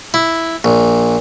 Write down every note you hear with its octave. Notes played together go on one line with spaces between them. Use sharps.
E4
A#1